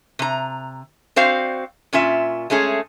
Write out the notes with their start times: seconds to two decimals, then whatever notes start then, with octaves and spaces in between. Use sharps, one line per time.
0.19 C3 A#5
1.16 C4 F#4 C5 D5 F5
1.93 A#2 C#4 F4 E5
2.50 G#3 A3 C#4 G#4